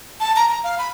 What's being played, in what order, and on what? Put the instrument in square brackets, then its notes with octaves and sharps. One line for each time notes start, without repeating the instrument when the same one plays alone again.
[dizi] A5
A#5
A#5
F5
B5